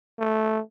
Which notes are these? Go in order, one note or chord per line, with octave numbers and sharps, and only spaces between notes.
A3